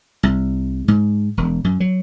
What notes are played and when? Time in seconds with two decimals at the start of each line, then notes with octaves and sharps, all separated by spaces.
0.23 C2
0.88 G#2
1.37 E1
1.64 F#2
1.80 F#3